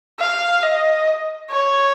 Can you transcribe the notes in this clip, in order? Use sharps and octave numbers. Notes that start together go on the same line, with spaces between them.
F5
D#5
C#5